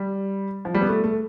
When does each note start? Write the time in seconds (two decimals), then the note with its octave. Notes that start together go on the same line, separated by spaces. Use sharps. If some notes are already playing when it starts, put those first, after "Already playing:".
Already playing: G3
0.65 F3
0.75 G3
0.81 B3
0.89 A3
1.04 A3